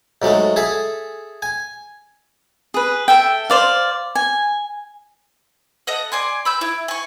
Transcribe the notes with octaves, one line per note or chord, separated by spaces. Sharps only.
G#2 F#3 G#3 A3
G#4 A4 E5
G#5
G#4 B4
A4 E5 G5
C5 D5 F5
G#5
A4 D#5 F#5
D5 G#5 C6
B5 E6 G6
E4
G#5 C#6